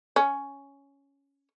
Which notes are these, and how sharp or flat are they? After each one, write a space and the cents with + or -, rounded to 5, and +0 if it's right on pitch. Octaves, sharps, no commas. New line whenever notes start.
C#4 +5